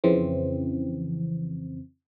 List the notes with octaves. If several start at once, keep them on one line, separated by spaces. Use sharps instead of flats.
F2 C#3 E3 C4